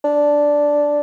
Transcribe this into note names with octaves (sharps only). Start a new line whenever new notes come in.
D4